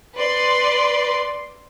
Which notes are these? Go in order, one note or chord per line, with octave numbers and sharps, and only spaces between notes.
B4 D5 C6